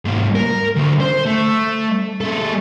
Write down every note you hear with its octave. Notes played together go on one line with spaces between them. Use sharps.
G#2 A#3
A#4
D2
C5
A3
G#3 A4